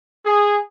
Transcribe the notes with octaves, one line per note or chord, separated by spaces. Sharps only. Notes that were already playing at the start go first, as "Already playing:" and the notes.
G#4